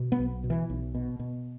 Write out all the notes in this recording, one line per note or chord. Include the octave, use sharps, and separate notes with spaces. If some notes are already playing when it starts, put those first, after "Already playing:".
Already playing: B2
B3
B1
B2
E3
B1
B2
B2